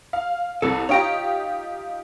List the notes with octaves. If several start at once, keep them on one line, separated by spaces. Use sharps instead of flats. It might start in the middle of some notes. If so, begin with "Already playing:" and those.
F5
C2 C3 A4
D#4 F4 G4 C#5 G5 A#5